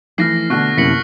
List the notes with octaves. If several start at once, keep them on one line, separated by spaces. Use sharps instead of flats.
E3 F3 A3 F6 A#6 C7
B2 D3 A3 C#6 F#6 C7
F1 F#2 C3 A#3 E4 B6 C#7 F#7